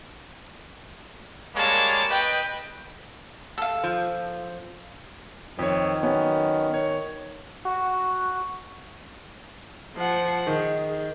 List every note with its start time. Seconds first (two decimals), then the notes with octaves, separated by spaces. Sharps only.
1.56 G3 G#3 A#3 C#5 A5
2.11 B4 D#5 G5
3.58 A4 F5
3.83 F3
5.59 F2 D#3 C#5
6.03 F#3 B3 C#4
6.74 C#5
7.65 F#4
9.96 F3 F#5
10.47 D#3 G#4